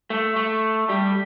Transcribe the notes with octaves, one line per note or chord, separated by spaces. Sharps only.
A3
A3
G3